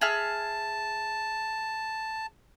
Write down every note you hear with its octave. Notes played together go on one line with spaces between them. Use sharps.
G#4 E5 A5 F6